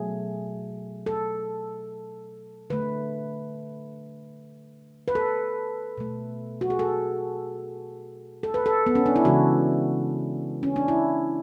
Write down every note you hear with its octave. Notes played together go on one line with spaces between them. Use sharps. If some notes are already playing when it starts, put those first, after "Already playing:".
Already playing: B2 F#3 A3 G#4
A4
D3 A3 B4
B4
A4
B2 A3
F#4
G#4
A4
A4
B4
A4
B3
C#4
D4
E4
C#3 E3 G#3 F#4
C#4
D4
E4